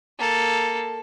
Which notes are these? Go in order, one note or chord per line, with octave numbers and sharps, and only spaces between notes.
A#3 A4